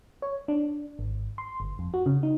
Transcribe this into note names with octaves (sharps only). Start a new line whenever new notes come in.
C#5
D4
G#1
C6
G1
F2
F#4
C#3
D#4